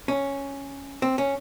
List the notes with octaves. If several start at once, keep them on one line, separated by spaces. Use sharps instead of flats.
C#4
C4
C#4